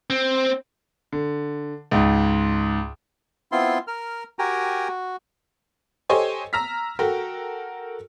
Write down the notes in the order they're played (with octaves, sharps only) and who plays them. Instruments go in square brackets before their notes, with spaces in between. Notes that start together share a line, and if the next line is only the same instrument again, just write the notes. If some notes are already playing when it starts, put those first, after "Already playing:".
[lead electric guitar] C4
[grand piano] D3
C#2 G#2
[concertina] B3 C4 E4 F4 C6
A#4 F6
F#4 G4 A#4 G5 G#5 A#5
F#4
[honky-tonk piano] G4 A4 C5 C#5 D#5 G#5
A#5 E6 F6 A#6 B6
F#4 A4 A#4 G5